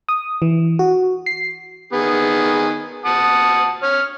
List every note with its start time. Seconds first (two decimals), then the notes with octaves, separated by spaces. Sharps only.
0.09 D#6
0.42 E3
0.79 F#4
1.26 C7
1.93 D#3 B3 G#4
3.05 F#5 A5 D#6
3.83 C#5 F6